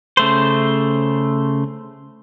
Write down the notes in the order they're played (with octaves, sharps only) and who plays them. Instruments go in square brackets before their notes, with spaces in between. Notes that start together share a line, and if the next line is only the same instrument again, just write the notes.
[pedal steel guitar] C#3 A3 C5